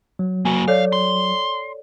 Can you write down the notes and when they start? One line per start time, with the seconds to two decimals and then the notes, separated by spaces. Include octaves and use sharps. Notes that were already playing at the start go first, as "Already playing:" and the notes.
0.19 F#3
0.45 A#3 F#4 G#5
0.68 A4 C#5 D5 F5
0.93 C6